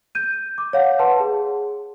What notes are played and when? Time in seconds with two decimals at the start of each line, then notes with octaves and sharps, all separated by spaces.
0.15 G6 D#7
0.58 D6
0.73 C#5 F5 F#5
0.99 B4 F#5 A5 C6
1.20 G#4